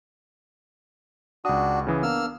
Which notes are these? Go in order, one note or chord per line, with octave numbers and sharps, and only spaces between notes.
C#2 D4 F#4 D#6
C#3 E3 D#6
A#3 B3 D4 E6 F6